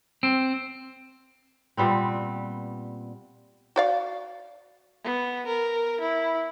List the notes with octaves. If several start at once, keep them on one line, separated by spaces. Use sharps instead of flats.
C4
A#2 G3 B3 C4
F#4 D5 F5
B3
A#4
E4